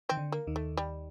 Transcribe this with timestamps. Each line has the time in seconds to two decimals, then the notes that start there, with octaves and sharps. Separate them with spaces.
0.09 D#3 C4
0.17 D3
0.32 A#3
0.47 D#2 D#3
0.56 A3
0.77 G3